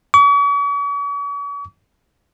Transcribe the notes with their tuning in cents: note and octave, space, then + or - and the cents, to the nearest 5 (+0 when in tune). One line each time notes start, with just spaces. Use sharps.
C#6 +45